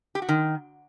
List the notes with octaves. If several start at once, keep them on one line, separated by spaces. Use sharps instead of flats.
G4
F#4
D#3